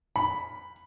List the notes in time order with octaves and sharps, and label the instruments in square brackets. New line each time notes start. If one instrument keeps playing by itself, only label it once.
[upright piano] B5